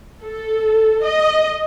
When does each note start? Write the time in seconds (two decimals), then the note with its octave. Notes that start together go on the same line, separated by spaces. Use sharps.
0.22 A4
1.03 D#5